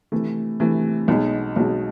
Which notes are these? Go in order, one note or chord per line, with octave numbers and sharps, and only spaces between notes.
C3 E3 A3
C3 E3 A3
B1 B2 G#3
B1 B2 G#3